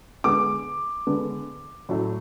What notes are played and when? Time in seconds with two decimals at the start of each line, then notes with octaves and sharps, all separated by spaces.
0.24 D3 G#3 B3 D6
1.07 D3 G#3 B3
1.89 A2 F#3 A3